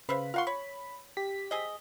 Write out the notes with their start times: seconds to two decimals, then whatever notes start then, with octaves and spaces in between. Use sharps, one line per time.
0.09 C#3 B4 C5 E5 F5 B5
0.34 F4 A#4 F5 F#5 C6 C#6
0.47 C#5 B5
1.17 G4 B6
1.51 C4 G#4 D#5